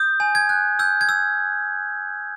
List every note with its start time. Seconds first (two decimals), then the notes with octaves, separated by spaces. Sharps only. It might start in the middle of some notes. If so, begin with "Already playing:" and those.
Already playing: D#6 G6
0.20 G#5
0.35 G#6
0.49 F#6
0.79 E6 G6
1.01 G#6
1.09 E6